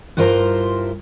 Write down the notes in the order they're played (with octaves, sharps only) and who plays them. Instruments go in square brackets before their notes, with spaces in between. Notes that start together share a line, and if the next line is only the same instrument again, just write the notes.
[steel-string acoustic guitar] G2 E4 F4 A#4 C5 A#5